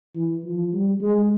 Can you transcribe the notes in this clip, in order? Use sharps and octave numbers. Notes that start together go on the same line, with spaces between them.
E3
F3
G3
G#3